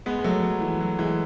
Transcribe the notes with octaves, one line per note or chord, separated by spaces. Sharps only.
G#3 B3
G#3
F#3 A3
F#3
E3
F#3
E3 G#3